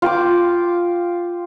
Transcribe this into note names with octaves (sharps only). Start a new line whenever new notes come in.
F4 G5 D6